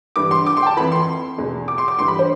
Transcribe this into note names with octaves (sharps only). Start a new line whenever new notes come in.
G2 E3 D6
C6
D6
C6
G5
A5
F2 E3 B5
C6
E2 B2
D6
C6
D6
G2 E3 C6
B5
C5